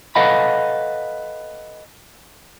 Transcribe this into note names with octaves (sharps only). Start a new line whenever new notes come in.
A4 B4 D#5 F5 F#5 B5